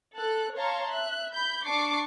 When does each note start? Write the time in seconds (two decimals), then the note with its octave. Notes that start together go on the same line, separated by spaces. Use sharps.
0.16 A4 F#6
0.57 C#5 F5 A5 A#5 C6 C#6
0.88 E5 F#6
1.32 B5 G6
1.66 D4 A5 C#6 D6 C7